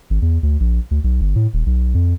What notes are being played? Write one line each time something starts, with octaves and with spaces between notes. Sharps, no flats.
G#1
E2
D2
A#1
D2
B1
G1
A2
D#1
B1
F2